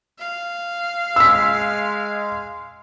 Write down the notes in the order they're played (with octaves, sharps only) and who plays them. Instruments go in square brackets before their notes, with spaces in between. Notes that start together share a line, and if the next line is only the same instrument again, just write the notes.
[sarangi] F5
[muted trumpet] G#3 [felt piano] E6 B6